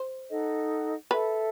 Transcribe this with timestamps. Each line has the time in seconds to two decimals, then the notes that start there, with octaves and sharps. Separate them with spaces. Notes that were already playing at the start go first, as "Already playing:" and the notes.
Already playing: C5
0.30 D#4 A4 D#5 F#5
1.11 A4 B4 E5 A5